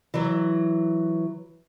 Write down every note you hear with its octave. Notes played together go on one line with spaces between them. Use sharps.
E3 F#3